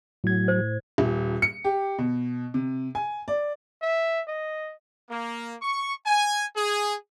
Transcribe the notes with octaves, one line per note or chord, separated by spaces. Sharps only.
A2 F#3 G#6
C5
D#1
C#7
G4
B2
C3
G#5
D5
E5
D#5
A#3
C#6
G#5
G#4